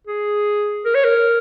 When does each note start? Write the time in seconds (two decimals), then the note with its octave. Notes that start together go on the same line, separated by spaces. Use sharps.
0.07 G#4
0.85 A#4
0.95 C#5
1.04 A#4